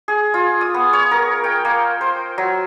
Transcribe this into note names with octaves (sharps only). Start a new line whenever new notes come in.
G#4
F4
D#6
B3
C#5
A#4
G5
A#3
C5
F#3